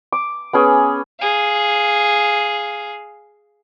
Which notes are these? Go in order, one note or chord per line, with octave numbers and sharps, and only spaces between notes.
D6
B3 C#4 G#4
G#4 F5